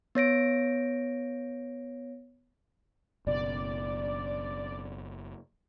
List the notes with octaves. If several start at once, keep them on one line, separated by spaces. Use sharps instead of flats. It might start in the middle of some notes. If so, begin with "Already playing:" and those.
B3 C#5 A#6 D7
F#1 B2 D5